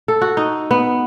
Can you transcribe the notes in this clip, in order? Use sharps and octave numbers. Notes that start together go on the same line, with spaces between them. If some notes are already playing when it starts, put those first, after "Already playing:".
A4
F#4
D#4
B3